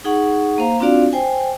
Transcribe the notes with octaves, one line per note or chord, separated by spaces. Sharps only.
D#4 G#4 F#5 C#6
A#3 C5 F5 A#5
C4 D4 F4 F#4 D5 F5
C5 G5 G#5